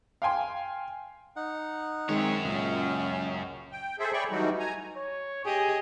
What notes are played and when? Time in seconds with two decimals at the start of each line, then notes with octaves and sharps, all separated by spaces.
0.22 F5 G5 G#5 C6
1.36 D#4 F#5
2.09 F#2 D#3 G#3 C4 C#5
2.45 C#2 A#2 C#4 D#5
3.72 G5
3.99 G#4 A4 C5 E5
4.13 G#4 C#5 D5 G5 B5 C#6
4.30 E3 F#3 G3 A3 D#4 F#4
4.59 G#5 A#5
4.97 C#5
5.45 G4 G#4 D#5